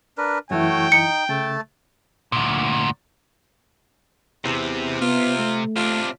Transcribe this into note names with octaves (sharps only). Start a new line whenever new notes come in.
D4 A#4 B4
F#2 E3 A3 E4 F#4 C#5 G5
D#4 C#7
C#3 A3 A5
D2 A#2
E2 C3
B3 F4
A3
C3 D4 F4